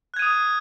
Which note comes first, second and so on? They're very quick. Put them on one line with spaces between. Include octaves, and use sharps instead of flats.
F#6 G#6 D#7 D#6